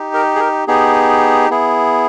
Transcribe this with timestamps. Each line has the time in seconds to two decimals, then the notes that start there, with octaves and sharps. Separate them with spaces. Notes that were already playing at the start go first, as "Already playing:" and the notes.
Already playing: D#4 G4
0.14 A#4
0.35 G#4
0.40 A#4
0.67 B3 D#4 G4 G#4
1.50 B3 E4 G#4